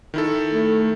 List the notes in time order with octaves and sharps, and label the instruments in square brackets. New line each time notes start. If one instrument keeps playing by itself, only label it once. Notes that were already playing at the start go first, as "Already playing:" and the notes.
[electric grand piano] D#3 E4 A4
[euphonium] A3